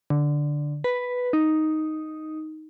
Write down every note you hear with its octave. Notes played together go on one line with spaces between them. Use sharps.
D3
B4
D#4